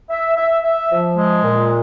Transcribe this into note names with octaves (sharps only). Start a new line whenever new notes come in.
E5
E5
E5
F3
G#3
A#2